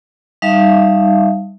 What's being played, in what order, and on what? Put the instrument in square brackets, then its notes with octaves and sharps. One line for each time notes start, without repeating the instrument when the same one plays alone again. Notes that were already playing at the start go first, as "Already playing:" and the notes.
[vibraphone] G3 D#4 E5 F5 A5